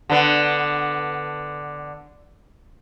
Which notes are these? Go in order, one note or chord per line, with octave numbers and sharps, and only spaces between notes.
D3 B3